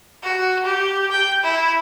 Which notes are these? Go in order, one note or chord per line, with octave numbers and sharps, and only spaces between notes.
F#4
G4
G5
E4